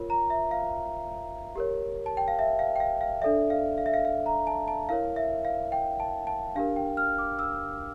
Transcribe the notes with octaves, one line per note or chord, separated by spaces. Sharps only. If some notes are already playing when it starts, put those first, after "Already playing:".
Already playing: F4 A#4 C#5
A#5
E5
F5
G4 A#4 C#5
A5
G5
F5
E5
F5
G5
F5
F5
D4 A4 D5 E5
F5
F5
E5
F5
F5
A#5
A5
A5
E4 A#4 C#5 F5
E5
F5
G5
A5
A5
D4 G4 A#4 F5
G5
F6
D6
E6